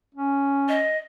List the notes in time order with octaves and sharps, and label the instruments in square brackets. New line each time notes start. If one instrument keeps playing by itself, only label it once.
[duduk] C#4
[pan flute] D#5